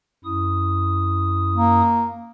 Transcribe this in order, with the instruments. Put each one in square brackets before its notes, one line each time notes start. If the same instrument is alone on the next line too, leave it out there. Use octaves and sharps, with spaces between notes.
[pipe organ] F#2 E4 D#6
[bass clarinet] A#3